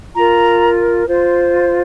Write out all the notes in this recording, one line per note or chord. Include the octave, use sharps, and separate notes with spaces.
F4 A#4 A#5
F4 C5